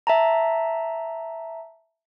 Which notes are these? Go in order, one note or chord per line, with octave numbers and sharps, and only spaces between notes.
E5 A5 A#5